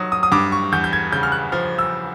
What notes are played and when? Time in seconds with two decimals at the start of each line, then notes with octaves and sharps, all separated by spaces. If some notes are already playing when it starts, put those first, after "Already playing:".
Already playing: G2 D#3 F#3 D#6
0.12 D#6
0.23 D#6
0.32 G2 D6
0.52 C#6
0.72 E2 G6
0.84 G6
0.93 G#6
1.12 C#3 G6
1.23 F6
1.32 F#6
1.52 F3 F6
1.79 E6